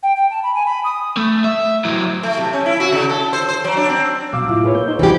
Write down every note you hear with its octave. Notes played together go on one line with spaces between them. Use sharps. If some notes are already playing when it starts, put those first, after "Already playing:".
G5
G5
A5
B5
G#5
B5
D#6
A3
E5
F#3 E4
A3
C3
C#4
E4
F#4
C#3
A4
C5
C5
F#3
D4
C4
B2 F#3 F5 D6 E6
A2 E4 F4
G#4 B4 C#5
A#3 G6
D#4 C5
E3 D4 F#4 G4